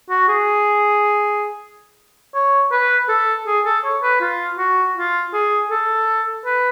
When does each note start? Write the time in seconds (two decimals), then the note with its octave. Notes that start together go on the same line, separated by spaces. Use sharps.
0.10 F#4
0.28 G#4
2.35 C#5
2.72 B4
3.09 A4
3.47 G#4
3.66 A4
3.84 C#5
4.03 B4
4.21 F4
4.58 F#4
4.96 F4
5.33 G#4
5.70 A4
6.46 B4